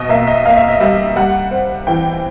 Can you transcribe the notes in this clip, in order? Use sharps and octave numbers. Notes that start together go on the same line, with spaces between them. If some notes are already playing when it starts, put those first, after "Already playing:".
Already playing: B2 D#5
A#3 E5
D#5
A#3 F5
E5
D#5
G3 E5
G3 F#5
C4
E3 G5